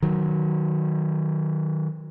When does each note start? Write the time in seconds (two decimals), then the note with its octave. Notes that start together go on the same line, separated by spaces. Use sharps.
0.02 D#3 F#3